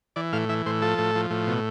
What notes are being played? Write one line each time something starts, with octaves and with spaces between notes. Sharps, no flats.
E3 D5
A2 F5
E3 E5
A2 C5
F3 A4
A2
F3
A2
B2